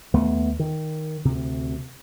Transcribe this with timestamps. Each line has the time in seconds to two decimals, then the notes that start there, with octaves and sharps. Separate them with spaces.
0.14 D#2 A3 B3
0.60 D#3
1.25 D2 C3